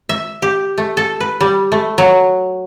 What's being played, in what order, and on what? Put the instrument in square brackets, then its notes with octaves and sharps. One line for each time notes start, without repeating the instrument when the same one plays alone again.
[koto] E5
G4
A3
A4
B4
G3
A3
F#3